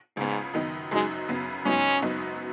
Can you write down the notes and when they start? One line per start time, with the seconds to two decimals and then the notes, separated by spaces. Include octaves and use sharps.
0.17 C#2 G#2 C#3 B3
0.54 F#2 D#3 B3 D#4
0.91 F#1 F#2 F#3 G#3 D#4
1.28 F#2 C#3 B3
1.65 G#2 F#3 B3 C#4 D#4
2.02 F#1 F#2 F#3 B3 D#4